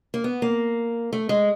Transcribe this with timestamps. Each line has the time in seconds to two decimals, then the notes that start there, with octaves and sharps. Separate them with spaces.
0.14 A#3
0.24 B3
0.42 A#3
1.13 A3
1.29 G#3